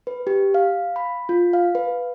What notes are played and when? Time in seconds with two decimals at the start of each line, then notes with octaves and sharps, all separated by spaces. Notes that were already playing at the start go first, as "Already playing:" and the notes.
0.07 B4
0.27 G4
0.54 F5
0.96 B5
1.29 F4
1.53 F5
1.75 B4